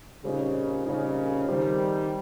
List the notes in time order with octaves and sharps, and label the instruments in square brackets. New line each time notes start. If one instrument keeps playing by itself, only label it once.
[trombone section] A#2 C#3 [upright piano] G3 C4 D#4
[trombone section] A#2 C#3 [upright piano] G3 C4 D#4
[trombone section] D#3 G3 [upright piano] C4 G4 C5